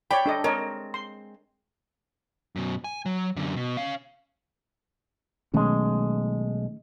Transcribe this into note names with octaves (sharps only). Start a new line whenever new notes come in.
C#5 D5 G5 B5
D4 A4 D#5
G#3 C4 A#4 C#5 D#5
C6
F#2 B2
G#5
F#3
F#2 D3
B2
C#4 F5
B1 D#3 G#3 A3 C#4